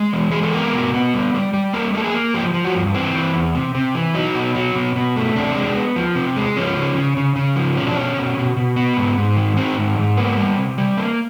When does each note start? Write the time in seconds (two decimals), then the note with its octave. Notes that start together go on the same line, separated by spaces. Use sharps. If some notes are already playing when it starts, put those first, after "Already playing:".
Already playing: G#3
0.13 E3
0.32 G#3 G#4
0.43 A4
0.53 B3 A#4
0.73 B2
0.94 B3
1.14 G3
1.34 G3
1.53 G3
1.73 A#3 A#4
1.94 A#3 A4
2.04 G#4
2.14 A#3
2.34 F3 G4
2.54 F3
2.64 F#4
2.75 G2
2.94 E3 C4
3.15 E3
3.35 E2
3.55 C3
3.75 C3
3.95 E3
4.14 F#3 D#4
4.35 B2
4.55 F#3
4.76 B2
4.96 B2
5.16 A3
5.36 C3 D4
5.55 G#3
5.75 B3
5.96 F3
6.16 C3
6.36 G#3
6.56 F3 C#4
6.76 C#3
6.96 C#3
7.17 C#3
7.36 C#3
7.56 F3
7.77 B2 C#4
7.86 D4
7.96 B2 C#4
8.17 B2
8.37 B2
8.57 B2
8.76 B3
8.97 G#2
9.18 G#2
9.37 D#3
9.57 D#3 C4
9.78 G#2
9.98 G#2
10.17 A#3 B3
10.37 G3
10.57 C3
10.78 G3
10.97 A#3